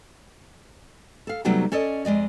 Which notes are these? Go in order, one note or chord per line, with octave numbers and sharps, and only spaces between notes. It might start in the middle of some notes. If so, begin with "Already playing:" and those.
A4 F5
C3 F#3 G3 A3 B3 D#4
C#4 A4 D5 D#5
F2 G#3 D5 D#5